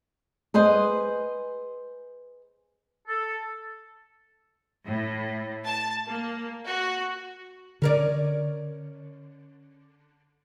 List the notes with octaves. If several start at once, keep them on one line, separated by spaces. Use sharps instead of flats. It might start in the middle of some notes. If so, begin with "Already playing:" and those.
G#4 B4 C5 D#5
A4
A2
A5
A#3
F#4
D3 C#4 A#4 D5